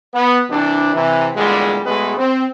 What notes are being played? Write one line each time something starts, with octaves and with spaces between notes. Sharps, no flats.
B3
C2 C3 E3 D4
C3 E3
E2 A#2 D3 G3 G#3
B1 G#3 A3 B3 G#4 B4
C4